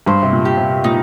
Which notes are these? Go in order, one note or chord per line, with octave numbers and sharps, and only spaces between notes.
G2 C5
C3
A#2
G4
C3
A#2 D#4